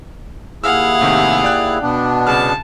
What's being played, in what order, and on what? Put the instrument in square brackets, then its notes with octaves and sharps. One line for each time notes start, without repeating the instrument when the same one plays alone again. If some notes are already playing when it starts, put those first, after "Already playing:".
[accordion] D#2 E4 G#4 [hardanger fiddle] F5 F#5 [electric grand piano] E6 F6
[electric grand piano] A2 C3 D#3
D5 G5 F#6
[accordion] B2 B3 D4
[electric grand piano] C2 C#3 F6 [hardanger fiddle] A5